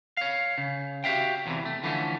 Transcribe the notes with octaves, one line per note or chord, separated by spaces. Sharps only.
C#5 F5
C#3
F#4 G4 C5 E5 F5 G5
E2 C3 D#3 E3
A3
D3 E3 F3 A3 C4 C#4